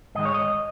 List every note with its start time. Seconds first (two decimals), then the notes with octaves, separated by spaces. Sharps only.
0.15 G#2 D#3 G#3 D#5
0.25 C#5
0.34 D#5